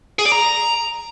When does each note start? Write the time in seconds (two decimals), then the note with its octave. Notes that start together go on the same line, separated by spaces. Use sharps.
0.19 G#4
0.25 D5
0.32 A#5